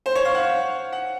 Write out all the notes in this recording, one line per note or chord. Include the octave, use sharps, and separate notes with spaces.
C5
C#5
F5
F#5
F#5